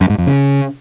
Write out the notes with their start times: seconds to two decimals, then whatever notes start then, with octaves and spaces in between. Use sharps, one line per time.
0.01 F#2
0.10 G#2
0.18 F2
0.27 C#3